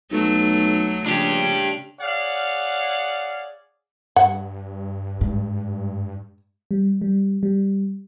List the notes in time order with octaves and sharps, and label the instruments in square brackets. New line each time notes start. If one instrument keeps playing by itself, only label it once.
[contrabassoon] B1 [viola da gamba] F#3 A3
[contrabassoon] A#1 [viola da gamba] C#3 [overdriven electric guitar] D4 G4
[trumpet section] G#4 C#5 D5 F5 F#5
[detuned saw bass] G2 [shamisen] F#5
[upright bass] G#2
[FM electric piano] G3
G3
G3